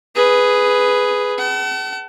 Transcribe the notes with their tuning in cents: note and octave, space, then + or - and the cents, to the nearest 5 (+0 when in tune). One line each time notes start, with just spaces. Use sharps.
G#4 +0 B4 +5
F#5 +45 A5 +5